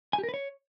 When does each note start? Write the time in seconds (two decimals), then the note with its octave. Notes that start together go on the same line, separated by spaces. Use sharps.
0.13 G#5
0.18 G4
0.23 A#4
0.29 B4
0.34 C#5